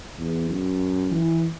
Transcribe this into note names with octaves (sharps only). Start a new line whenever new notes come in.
E2
F#2
E3